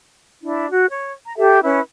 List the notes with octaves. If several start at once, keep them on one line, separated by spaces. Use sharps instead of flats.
D4 E4
F#4
C#5
A#5
G4 A4 E5
C#4 E4 B4